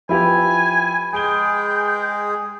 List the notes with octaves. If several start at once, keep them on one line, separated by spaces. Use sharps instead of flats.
F3 E4 G4 B4 E5 G#5 B5
G#3 G#4 G5 G#5 D7 G7